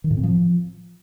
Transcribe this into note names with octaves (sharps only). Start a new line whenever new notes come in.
D#3
A2
C4
F3